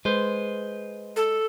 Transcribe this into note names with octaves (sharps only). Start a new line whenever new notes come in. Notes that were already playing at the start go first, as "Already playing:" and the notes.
G#3 B4 C5
A4